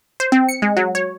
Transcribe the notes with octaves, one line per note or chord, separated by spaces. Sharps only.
C5
C4
C#7
G#3
F#3
C#5